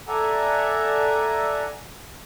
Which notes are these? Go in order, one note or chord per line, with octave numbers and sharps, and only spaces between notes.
A4 D5 E5 F#5 G#5 A#5